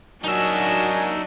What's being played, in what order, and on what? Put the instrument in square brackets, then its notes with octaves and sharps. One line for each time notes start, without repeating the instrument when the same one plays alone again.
[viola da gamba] F#3 D4 D#5 [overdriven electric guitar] D#4 E5 [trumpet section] F#4 A#4 G#5